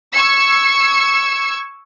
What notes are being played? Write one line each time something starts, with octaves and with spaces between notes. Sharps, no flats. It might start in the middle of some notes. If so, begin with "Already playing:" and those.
C#6 E6 G#6 C#7